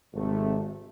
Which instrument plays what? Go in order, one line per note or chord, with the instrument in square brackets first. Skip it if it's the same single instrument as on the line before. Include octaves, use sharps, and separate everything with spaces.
[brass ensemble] G#1 C3 A3